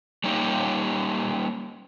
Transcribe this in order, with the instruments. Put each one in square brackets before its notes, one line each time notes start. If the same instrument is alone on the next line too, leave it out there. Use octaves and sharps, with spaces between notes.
[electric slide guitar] G3 A#3 C#4 D#4 G4